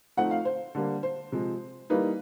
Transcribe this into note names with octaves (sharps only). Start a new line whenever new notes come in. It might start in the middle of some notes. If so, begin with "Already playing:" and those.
F3 A3 C4 D#4 F#5
F5
C5
D3 G3 A#3
C5
C3 F3 G#3
E3 G3 A#3 D#4 B4